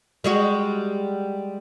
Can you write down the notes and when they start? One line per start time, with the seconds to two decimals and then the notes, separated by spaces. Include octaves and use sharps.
0.24 G3 G#3 F#4